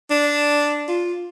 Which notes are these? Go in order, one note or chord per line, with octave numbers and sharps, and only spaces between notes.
D4
F4